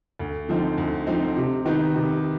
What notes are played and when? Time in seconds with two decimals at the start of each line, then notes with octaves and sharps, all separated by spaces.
0.19 D2
0.49 D3 F3 C4 D#4
0.78 D2
1.07 D3 F3 C4 D#4
1.36 C3
1.65 D#3 B3 D#4
1.94 C3